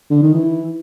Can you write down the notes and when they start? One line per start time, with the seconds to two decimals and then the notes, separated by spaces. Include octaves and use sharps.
0.11 D3
0.23 D#3
0.34 E3